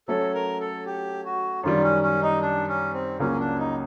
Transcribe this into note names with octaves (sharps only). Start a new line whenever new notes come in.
F#3 A3 C#4 A4
A#4
A4
G4
F#4
F#2 D#3 G3 F4
C#4
C#4
D#4
D4
C#4
C4
C#2 C#3 F#3 A#3 C#4
D4
D#4